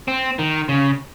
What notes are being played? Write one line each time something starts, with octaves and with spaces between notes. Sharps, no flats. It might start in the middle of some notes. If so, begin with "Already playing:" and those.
C4
D#3
C#3